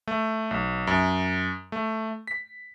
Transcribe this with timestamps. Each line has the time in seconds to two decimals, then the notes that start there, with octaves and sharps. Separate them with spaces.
0.07 A3
0.51 B1
0.87 F#2
1.72 A3
2.27 B6